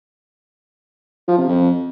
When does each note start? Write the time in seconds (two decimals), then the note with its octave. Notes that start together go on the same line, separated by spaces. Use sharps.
1.28 F3
1.38 C3
1.48 F2